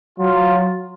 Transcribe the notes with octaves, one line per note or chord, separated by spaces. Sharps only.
F#3 F4